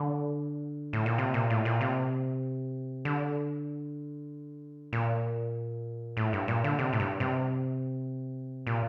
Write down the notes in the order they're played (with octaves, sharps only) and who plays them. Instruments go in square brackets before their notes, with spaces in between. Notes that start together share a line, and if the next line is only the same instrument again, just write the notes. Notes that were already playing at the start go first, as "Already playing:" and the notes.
Already playing: [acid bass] D3
A2
A#2
C3
A#2
A2
A#2
C3
D3
A#2
A2
G2
A#2
D3
C3
A2
G2
C3
A#2